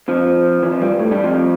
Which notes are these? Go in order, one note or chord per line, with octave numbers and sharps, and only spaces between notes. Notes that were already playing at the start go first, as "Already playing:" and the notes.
F2 F3
E2 E3
F2 F3
G2 G3
A2
G2 G3
F2 F3